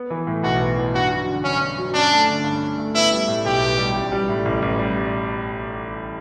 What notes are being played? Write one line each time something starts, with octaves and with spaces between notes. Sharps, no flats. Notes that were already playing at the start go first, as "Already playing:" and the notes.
Already playing: B3
E3
A2
B1 F#4
B3
E3
G2 F#4
F#3
D3
G2 C#4
G2
F#3
C#4 D4
A3
D3
G2
C#4
A3
B3 E4
G3
A2
B1 G4
B3
G3
A1
G3
A2
A1
A1
G3